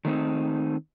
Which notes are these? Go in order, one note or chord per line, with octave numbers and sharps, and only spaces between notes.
D#3 A3 C4 D#4